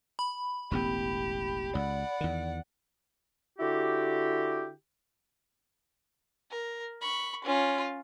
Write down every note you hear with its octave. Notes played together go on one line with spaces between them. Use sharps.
B5
E1 A1 B3 G4
C#2 D5 F#5
E2 D#3
D3 E4 F#4 G4
A#4
B5 C#6
C#4 F4